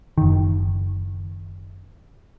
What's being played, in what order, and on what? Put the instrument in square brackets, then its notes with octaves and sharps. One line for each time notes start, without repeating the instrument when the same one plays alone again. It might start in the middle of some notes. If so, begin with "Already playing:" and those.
[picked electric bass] F#1 D#3